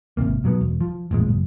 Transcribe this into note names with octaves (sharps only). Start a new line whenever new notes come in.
G#1 D#2 C3 A#3
B2 F#3 G#3 B3
E1
F3
A1 F2 A#2 G#3
F#1